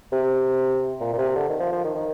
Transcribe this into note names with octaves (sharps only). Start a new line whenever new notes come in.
C3
A#2
A#2
C3
D3
D#3
F3
F3
D#3
D#3